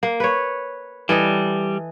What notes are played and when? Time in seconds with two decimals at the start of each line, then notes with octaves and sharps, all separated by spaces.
0.03 A#3
0.20 B4 C#5
1.09 E3 G3 A4 D#5